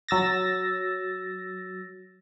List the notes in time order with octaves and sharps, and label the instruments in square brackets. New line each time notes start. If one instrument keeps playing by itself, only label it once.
[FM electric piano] F#3 E6 A6 A#6